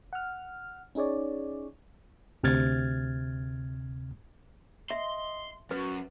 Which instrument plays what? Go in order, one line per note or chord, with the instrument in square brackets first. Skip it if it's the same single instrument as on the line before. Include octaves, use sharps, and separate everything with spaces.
[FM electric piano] F#5 F6
C#4 D#4 G#4 C#5 D5
[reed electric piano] D2 C3 F6 G#6 A6
[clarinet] D#5 [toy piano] E5 [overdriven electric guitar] C6
[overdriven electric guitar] F#2 [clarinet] F#4 [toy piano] B4